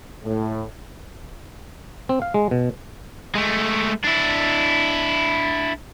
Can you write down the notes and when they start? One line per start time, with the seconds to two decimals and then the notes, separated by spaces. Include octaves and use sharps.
0.24 A2
2.09 C4
2.22 F5
2.34 G#3
2.51 B2
3.35 G#3 A3
4.04 D4 E4